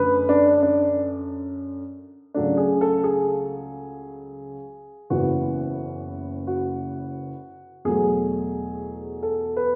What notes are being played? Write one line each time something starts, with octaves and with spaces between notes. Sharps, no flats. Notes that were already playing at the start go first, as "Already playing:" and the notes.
Already playing: F#2 D3 A3 B4
D4
D4
C#2 C#3 F#3 A3 D4
G#4
A4
G#4
F#1 F#2 E3 B3 F#4
F#4
E2 B2 F#3 A3 G#4
A4
B4